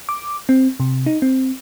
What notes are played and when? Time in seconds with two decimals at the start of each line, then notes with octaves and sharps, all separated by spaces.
0.09 D6
0.49 C4
0.80 C3
1.06 D#4
1.22 C4